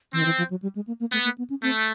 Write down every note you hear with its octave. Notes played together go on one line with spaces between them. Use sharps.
E3 C4
D#3
E3
F3
F#3
G3
G#3
A#3
A#3
A3 B3
A#3
B3
C#4
A3 C4